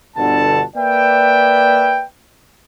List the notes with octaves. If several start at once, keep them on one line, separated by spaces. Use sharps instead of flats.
G1 B2 D3 F#5 A5
A#3 B4 D5 E5 G5